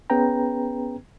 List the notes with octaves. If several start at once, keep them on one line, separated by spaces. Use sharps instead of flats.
B3 C#4 G#4 B4 G5 A#5